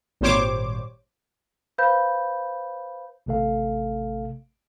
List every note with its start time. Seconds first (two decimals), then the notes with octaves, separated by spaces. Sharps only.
0.21 G#1 A#2 G3 C5 C#5 D6
1.78 B4 C5 F5 B5 G6
3.26 A1 C3 A3 A4 F5